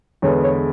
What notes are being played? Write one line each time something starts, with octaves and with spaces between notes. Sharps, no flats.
E2 D3 G#3 B3 C#5
C#5